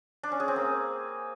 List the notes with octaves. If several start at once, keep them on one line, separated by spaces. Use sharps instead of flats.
D4
C#4
G#4
C4
A#3